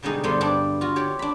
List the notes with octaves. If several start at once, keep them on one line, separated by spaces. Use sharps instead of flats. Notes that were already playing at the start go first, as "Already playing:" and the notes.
B2 D3 G3 G#3 D#4 G#4
G2 D3 G3 B3 C5 C6
G2 D4
F4 F#4
G4 C#5 D5
D4 B5